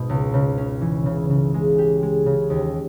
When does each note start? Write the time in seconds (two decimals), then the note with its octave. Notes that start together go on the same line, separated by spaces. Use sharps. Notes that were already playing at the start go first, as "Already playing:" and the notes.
Already playing: G#1 B2 D#4
0.09 C#2
0.34 C#3
0.58 C#4
0.81 E3
1.06 C#3
1.30 C#3
1.54 G#3
1.78 G4
2.02 G#3
2.26 C#3
2.50 D#2